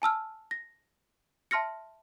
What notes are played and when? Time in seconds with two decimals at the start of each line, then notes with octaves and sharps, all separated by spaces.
0.02 G#5 A5 E6 F6
0.51 A#6
1.51 E5 A5 C6 F6 A#6 C#7